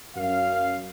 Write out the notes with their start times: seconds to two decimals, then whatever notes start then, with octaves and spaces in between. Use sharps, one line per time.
0.16 F#2 F5